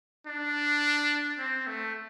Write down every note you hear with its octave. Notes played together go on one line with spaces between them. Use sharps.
D4
C4
A3